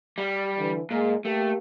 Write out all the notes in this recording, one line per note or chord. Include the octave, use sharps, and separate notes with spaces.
G3
D3 E3
A#2 G#3
A3 A#3 G4